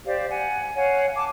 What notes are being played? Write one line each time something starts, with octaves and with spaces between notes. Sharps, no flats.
G4 C5 D5 F5
F#5 G#5
C#5 F5 F#5 G#5
A5 D6